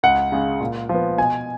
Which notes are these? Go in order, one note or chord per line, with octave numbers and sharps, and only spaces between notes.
C#2 F#5
C#3 G#3
A#2
F3 B3
B2 G#5